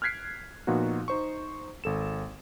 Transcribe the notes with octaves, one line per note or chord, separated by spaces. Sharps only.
F6 F#6 G#6 B6 C7 D7
A#2 F3 B3 D#4 F#4
D#4 C5 C#6
G#1 A4 E7